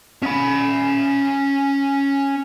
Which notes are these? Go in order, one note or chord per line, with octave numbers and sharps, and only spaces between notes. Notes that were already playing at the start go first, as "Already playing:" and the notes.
C#4 B5